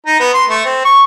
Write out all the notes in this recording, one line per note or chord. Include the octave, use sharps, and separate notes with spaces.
D#4
B3
C6
A3
C4
C#6